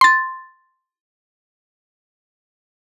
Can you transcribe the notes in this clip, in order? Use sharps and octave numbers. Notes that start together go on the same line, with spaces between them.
C6 A6